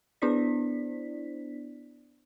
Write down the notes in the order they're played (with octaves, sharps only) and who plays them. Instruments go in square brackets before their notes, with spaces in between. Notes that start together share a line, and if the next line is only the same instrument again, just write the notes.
[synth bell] B3 D4 E4 C5 D5 B6